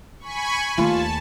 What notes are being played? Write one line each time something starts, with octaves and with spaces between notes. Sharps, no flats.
G#5 B5 C#6
D#2 A3 F4 A5